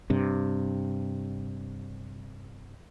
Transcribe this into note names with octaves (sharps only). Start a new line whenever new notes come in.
G2 C3